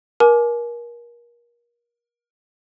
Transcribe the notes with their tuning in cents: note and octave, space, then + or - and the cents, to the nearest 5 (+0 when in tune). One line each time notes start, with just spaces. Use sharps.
A#4 +30 G#5 +35 D6 +0